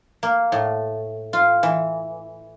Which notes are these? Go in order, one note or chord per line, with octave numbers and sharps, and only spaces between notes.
A#3
A2
F4
E3